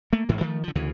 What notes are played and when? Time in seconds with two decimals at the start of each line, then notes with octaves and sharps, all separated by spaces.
0.13 A3 A#3
0.29 A1 G#2 E3
0.41 D#3 F3 A3
0.63 D3 F3
0.75 D2 C#3 E3